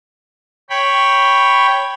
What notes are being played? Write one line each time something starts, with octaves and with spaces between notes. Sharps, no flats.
C#5 G5 B5